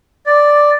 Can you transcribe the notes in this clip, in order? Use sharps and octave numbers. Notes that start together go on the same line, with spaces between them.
D5